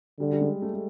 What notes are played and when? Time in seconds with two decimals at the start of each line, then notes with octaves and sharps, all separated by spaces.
0.19 D3 G3
0.32 G3
0.41 G#3
0.62 A3
0.74 A3